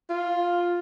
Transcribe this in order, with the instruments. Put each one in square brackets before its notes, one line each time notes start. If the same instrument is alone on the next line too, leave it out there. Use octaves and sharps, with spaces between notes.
[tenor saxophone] F4